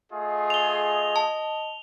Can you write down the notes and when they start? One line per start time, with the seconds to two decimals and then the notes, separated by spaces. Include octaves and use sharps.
0.13 A3 F4 G#4 D#5
0.50 F7 G7
1.16 A5